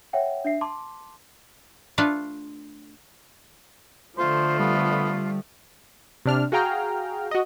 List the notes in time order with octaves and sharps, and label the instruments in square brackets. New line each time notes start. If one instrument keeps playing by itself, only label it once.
[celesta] C#5 E5 F#5 G5
D4 E5 C7
A5 C6 D6
[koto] A3 D4 F4 B4 F5
[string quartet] D3 F3 A3 [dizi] F4 [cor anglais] C5
[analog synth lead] G3 [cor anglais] B3
[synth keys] C3 D4 F6
F#4 G#4 F5 G5 A#5 F6
F#4 D#5